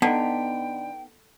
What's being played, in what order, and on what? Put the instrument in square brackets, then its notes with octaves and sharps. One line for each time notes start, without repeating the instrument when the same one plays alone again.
[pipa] D3 [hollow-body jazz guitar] B3 D#4 [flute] G5